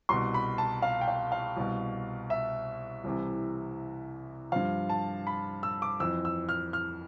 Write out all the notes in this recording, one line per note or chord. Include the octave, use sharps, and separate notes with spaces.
C2 B2 C6
B5
A5
F5
G5
F5
F5
C2 B2
E5
C2 C3 E3
G2 F3 F5
A5
B5
E6
D6
F2 E3 E6
E6
F6
F6